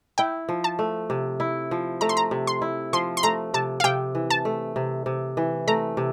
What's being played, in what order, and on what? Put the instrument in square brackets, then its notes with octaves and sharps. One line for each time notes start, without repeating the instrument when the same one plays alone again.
[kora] E4 [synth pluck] G5
[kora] F3
[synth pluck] A5
[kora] A3
C3
E4
F3
[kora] A3 [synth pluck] A#5
[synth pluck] C6
A#5
[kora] C3
[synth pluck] C6
[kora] E4
[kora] F3 [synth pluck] C6
[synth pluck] C6
[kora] A3 [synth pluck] A#5
[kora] C3 [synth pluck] A5
[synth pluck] F5
[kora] C3 [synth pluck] G5
[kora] E3
[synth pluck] A5
[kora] A3
C3
C3
E3
[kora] A3 [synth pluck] A#5
[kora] C3